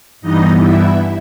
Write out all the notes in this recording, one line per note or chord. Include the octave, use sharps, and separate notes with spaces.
G2 E3 G3 B3 D#4 D#5
E4 E5